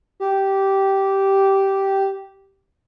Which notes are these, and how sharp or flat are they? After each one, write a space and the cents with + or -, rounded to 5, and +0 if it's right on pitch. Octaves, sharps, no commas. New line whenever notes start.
G4 -10